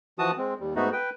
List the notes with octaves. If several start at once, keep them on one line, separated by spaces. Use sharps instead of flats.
E3 F3 F#4 A5 D#6
G#3 C4
D#2 G3
G#2 A3 B3 D#4 F#4
B4 G5